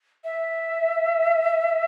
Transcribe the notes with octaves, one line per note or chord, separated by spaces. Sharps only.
E5